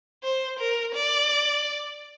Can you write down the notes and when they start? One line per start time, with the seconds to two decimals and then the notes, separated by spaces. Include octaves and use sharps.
0.24 C5
0.59 A#4
0.95 D5